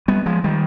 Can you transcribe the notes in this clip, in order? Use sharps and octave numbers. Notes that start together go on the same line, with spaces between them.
G3 B3
F3 G#3
D#3 G3